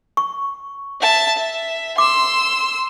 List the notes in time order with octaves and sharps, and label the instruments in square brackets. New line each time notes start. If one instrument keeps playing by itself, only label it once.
[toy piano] C#6
[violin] E5 A5
E5
[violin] C6 E6 [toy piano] D6